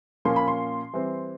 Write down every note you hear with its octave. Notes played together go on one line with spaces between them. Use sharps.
A#2 F3 A#3 C#4 C6
B5
C6
E3 G3 C4